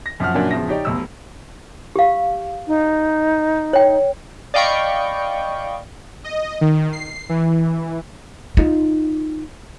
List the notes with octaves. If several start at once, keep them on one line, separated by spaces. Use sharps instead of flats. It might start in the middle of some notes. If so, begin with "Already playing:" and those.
A#6
F#2 F3 F#5 F6
F#2 A#2 A#3 C#4 D4 F#4
E2 C#3 F3 E5 A#6
D#4 G4 C#5 D5
F1 B1 E6
G4 F5
D#4
C#5 G5
D5 D#5 F5 G5 B5 C#6
D#5
D#3
C7
E3
D#4 F4